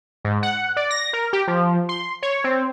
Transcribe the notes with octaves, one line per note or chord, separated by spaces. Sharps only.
G#2
F#5
D5
A#6
A#4
G4
F3
C6
C#5
C4